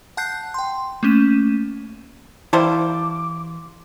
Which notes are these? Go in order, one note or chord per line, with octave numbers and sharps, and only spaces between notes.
F#5 A5 F#6 G6 C7
G5 C6
A3 A#3 C#4 D#7 E7
E3 G3 A#3 E4 C5 A5 D6